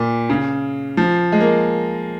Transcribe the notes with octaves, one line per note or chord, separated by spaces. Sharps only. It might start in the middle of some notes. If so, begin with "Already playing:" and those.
Already playing: A#2
C#3
F3
G#3
A#3